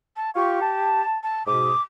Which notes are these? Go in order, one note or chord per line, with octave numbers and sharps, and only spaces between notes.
A5
F4 G4 F5 C#6
A5
A5
G#2 B2 D6 D#6